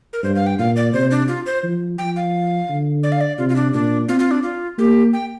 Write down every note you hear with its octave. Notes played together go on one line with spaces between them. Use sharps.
A#4
G2 C5
F5
G5
A#2 F5
D5
C3 C5
D4
F4
C5
F3
F3 G5
F5
D3
D5
F5
D5
C3 F4
F4
D4
A#2 D4
C4 F4
F4
D4
F4
A#3 G4
G5